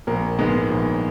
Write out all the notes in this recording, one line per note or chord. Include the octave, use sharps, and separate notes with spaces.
A#1 A#4
G#2 D#3 G#3 B3
A#1